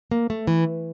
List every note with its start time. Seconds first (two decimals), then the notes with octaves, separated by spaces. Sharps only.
0.11 A#3
0.30 A3
0.47 E3